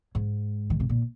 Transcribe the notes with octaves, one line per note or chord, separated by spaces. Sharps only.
G#2
D#3
C3
A#2